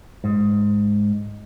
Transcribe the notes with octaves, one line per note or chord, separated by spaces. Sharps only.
G#2